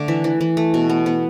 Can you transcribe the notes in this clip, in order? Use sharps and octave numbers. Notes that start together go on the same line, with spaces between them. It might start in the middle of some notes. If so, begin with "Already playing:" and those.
Already playing: D3 A3 D5
E3 E5
E3
E3
A3
B2
B3
B3